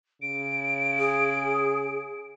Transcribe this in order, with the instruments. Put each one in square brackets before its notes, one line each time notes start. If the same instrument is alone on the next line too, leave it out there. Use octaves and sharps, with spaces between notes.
[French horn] C#3 [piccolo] D7
[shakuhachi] G#4